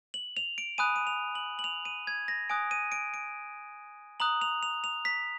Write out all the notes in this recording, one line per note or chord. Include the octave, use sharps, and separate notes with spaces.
F#7
F7
D7
G#5 B5 D#6 F#6 D#7
D#7
F7
F#7
F#7
F7
D#7
G#6
A#6
G#5 D#6 F#6 D7
D#7
D7
D7
A#5 D#6 F#6 F#7
F7
F7
F7
B6